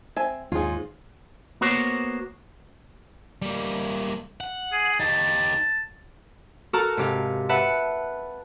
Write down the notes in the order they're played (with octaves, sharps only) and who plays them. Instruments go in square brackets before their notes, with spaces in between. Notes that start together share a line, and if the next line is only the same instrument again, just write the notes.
[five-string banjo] C4 E5 G#5
[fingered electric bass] D#2 [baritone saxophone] G#2 [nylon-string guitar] F4 [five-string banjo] G#4 C#5
[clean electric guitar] A#3 B3 F#4 C5 C#5
[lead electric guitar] G3 A#3
F#5
[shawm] G#4
[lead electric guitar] D#4 G4 [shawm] A5
[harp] F#4 A4 A#4 A5 A#5 F6
G#2 C3 G4 F5
B4 E5 F#5 A5